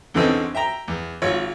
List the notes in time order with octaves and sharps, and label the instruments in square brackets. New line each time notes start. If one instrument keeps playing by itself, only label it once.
[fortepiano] E2 D3 E3 C4 C#4 D#4
E5 G5 A#5
E2
G#1 F4 C#5